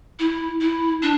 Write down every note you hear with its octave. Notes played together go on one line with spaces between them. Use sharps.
E4
E4
D4